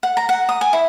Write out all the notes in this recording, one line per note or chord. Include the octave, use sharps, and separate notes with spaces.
F#5
A#5
F#5
D#6
G#5
E4